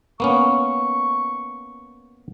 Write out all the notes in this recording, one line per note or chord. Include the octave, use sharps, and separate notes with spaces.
A#3 B3 C#4 C#6